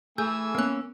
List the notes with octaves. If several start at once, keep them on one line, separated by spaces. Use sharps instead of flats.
E3 A3 G#4 G#5 E6 G6
A#3 B3 C#4 F#6